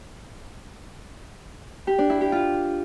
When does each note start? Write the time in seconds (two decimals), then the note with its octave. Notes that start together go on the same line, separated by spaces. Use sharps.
1.87 G4
1.98 D4
2.10 E4
2.21 G4
2.32 F4